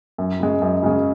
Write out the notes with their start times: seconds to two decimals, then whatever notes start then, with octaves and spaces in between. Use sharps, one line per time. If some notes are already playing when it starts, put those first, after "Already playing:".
0.18 F#2
0.40 C#3 G#3
0.62 F#2
0.83 C#3 G#3